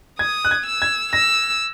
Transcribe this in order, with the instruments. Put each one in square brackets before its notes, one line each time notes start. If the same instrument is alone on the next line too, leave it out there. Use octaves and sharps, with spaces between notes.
[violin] D#6 [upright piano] G#6
[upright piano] F#6
G#6
[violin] E6
[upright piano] G#6
[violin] E6 [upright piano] A#6